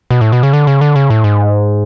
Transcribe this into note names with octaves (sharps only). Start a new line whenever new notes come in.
B2
A2
B2
C#3
D3
C#3
D3
C#3
A2
G#2